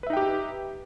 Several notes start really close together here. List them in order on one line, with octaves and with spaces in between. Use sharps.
B4 E5 D#4 G5 G4